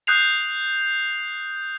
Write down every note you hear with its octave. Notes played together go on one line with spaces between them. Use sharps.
D#6 F#6 G6 C7 F7